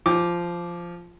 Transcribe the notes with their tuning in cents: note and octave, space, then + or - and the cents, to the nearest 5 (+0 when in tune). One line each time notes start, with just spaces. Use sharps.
F3 -10 G5 +35 D6 +0